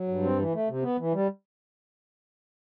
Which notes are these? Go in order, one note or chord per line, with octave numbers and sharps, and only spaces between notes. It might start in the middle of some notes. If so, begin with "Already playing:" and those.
Already playing: F#3
G2
C4
E3
A3
C3
B3
E3
G3